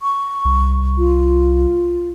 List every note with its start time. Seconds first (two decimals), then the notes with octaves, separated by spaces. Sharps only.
0.01 C#6
0.45 C2
0.98 F4